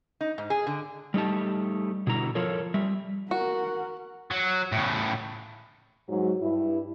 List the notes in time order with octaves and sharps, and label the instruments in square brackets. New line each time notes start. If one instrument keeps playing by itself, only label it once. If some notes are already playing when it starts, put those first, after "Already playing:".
[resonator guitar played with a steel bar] D#4
G#2
G#4
D3
[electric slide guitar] G3 A3 D#4 G4 A5
B2 D3 E4 A#5
F3 F4 A4 A#4 C#5
G3 E5
[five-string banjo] F#4 [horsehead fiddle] A#4 F#5
[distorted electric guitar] F#3
A2 C#3
[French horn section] G#2 F#3
G2 E4